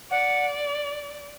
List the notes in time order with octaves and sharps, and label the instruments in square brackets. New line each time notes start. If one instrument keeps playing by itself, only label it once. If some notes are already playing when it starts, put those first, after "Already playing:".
[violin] D5 [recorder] F#5